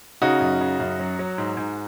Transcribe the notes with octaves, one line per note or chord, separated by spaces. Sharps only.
C#3 D#4 F#4
F#2
C#3
F#2
F#3
F#3
G#2
G#2